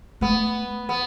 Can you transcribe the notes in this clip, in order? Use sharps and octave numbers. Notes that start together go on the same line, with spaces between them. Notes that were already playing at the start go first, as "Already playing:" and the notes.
A3 B3
B3